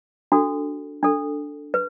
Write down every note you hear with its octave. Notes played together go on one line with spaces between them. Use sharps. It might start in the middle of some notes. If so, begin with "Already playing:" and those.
D4 F#4 A4
D4 A4
B4